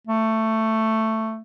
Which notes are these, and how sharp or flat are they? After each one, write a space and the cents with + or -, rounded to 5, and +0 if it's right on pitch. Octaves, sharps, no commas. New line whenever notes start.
A3 +10